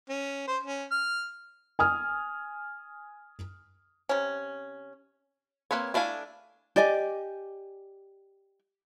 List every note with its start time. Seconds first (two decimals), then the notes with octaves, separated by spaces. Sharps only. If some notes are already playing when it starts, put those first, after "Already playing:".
0.09 C#4
0.47 C5
0.63 C#4
0.91 F6
1.79 G#5 D#6 F6
4.09 C3 C#4
5.71 A#3 C4 B4 C#5
5.94 A3 D4 E4 F5 G#5
6.76 G4 D5 D#5 G#5